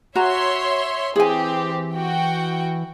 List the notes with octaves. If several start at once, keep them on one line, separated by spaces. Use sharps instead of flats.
F#4 C#5 E5 A#5 C6
E3 C4 G4 G#4 G#5
F#4 G5